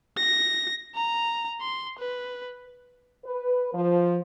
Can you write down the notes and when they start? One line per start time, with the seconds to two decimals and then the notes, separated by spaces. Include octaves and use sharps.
0.17 A#6
0.95 A#5
1.61 C6
1.98 B4
3.25 B4
3.74 F3